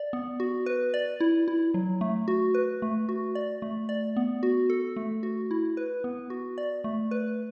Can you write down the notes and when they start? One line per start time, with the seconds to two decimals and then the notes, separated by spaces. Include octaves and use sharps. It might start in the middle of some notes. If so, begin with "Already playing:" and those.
Already playing: D5
0.13 B3
0.40 F#4
0.66 B4
0.94 D5
1.20 E4
1.48 E4
1.74 F#3
2.01 A3
2.28 F#4
2.54 B4
2.82 A3
3.09 F#4
3.35 D5
3.62 A3
3.89 D5
4.16 B3
4.43 F#4
4.70 A4
4.96 A3
5.23 F#4
5.51 E4
5.77 B4
6.04 B3
6.30 F#4
6.58 D5
6.84 A3
7.11 B4